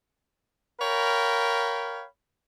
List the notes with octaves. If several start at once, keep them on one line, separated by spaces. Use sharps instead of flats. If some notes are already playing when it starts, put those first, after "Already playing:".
A#4 C#5 F5 G5 B5